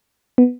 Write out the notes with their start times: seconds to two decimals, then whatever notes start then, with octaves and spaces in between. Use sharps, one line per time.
0.38 B3